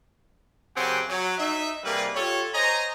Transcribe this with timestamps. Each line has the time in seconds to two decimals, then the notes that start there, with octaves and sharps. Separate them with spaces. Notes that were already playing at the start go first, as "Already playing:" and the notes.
0.77 F#2 C#3 C4 G4 F#5 G#5
1.09 F#3
1.39 D#4 E5
1.84 C3 G3 A#3 G#4 A#4 B4
2.15 F4 G4 A4 C#5
2.55 C5 C#5 D#5 G#5 A#5